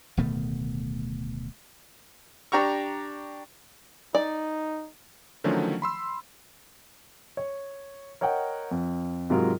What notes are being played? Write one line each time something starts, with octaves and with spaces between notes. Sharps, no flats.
D1 B2 D#3 A3
D4 G4 A#5 C#6
D#4 D5
D3 D#3 F3 F#3 A3 C#4
B5 C6 E6
C#5
A#4 C#5 D#5 F#5 G5
F2
G#2 C3 F#3 G#3 F4 A#4